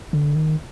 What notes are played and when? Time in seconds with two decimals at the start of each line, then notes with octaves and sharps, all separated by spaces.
0.13 D3
0.35 D#3